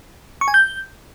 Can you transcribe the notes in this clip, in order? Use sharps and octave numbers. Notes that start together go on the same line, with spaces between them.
C#6
G#5
G6